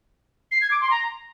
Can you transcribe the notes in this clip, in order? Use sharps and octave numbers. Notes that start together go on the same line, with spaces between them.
C7
G#6
D6
C6
A#5